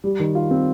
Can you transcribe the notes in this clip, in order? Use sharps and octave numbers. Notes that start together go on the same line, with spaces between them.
G3
D#3
F4
C4